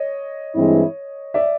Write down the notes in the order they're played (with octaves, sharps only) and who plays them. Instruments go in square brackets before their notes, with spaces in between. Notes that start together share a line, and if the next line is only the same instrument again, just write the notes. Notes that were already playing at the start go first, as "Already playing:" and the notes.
Already playing: [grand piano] C#5 D#5
[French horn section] G2 E3 G#3 C4 E4
[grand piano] D5 E5